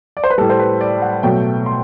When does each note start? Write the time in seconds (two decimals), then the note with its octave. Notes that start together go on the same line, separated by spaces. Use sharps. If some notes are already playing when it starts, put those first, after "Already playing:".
0.17 D5
0.24 C5
0.30 B4
0.38 A2 G3 A4
0.50 C5
0.59 B4
0.81 D5
1.02 F#5
1.23 B2 F#3 A3 G5
1.66 C6